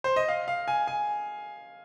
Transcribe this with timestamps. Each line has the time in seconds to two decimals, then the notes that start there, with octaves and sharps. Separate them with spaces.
0.04 C5
0.16 D#5
0.28 F5
0.48 F5
0.68 G#5
0.87 G#5